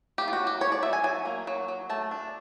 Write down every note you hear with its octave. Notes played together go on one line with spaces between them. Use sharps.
A#3 G4
F4
F#4
F#3
G4
D4 C#5
D5
F#3 E5
G#5
F#3 G#5
A#3
F#3
F#3
A3 A5
D4